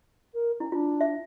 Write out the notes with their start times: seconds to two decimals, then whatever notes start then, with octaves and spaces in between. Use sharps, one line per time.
0.34 A#4
0.60 C#4 E4
0.72 D4 F4
1.01 E5